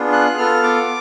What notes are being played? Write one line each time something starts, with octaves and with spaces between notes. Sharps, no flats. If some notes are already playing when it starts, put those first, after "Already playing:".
Already playing: B3 D4 F4 G#4
F#6
B3 F4 A4 F6
D6